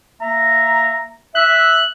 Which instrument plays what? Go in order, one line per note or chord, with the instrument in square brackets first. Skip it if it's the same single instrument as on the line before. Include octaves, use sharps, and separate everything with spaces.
[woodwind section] A#3 E5 A#5
[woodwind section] E5 [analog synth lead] F#6